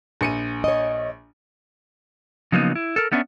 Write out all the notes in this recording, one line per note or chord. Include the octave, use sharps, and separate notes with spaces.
A#1 C#7 D#7
C#5 D#5
C#3 F3 F#3 A#3 B3 D#4
E4
A4 A#4
A3 B3 C#4 D4 B4 E5